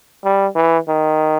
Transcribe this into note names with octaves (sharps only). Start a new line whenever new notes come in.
G3
E3
D#3